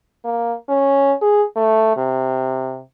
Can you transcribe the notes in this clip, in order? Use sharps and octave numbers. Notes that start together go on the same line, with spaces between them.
A#3
C#4
G#4
A3
C3